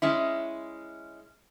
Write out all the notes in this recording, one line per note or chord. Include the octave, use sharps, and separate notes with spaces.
G#3 C#4 E4